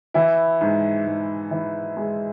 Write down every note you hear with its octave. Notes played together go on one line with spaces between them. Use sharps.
E3 E4
G#2
G#2
E3
G#3